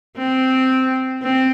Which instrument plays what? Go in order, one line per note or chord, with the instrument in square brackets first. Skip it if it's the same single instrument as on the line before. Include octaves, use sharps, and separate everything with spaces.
[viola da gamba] C4
C4